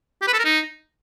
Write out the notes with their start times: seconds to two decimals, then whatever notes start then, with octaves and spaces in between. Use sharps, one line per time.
0.22 G4
0.27 B4
0.33 A4
0.39 A#4
0.45 D#4